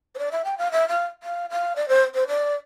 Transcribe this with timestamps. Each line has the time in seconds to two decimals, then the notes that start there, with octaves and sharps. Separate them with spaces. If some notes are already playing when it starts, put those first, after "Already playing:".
0.15 C5
0.18 D5
0.31 E5
0.44 G5
0.57 F5
0.71 E5
0.88 F5
1.23 F5
1.50 F5
1.76 D5
1.88 C5
2.14 C5
2.28 D5